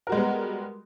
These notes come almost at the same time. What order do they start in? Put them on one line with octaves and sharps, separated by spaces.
A#4 F#4 G#3 G3 B3